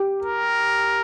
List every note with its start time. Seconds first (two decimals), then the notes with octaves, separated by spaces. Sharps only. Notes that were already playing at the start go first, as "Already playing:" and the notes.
Already playing: G4
0.22 A#4